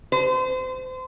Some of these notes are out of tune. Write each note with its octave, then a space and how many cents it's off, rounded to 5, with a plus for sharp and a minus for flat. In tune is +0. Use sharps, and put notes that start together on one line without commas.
C5 -30